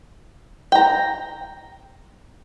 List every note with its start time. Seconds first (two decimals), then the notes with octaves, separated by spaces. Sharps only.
0.72 G5 A#5